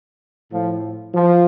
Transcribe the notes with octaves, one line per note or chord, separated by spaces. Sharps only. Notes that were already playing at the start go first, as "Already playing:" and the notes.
A2 F3
F3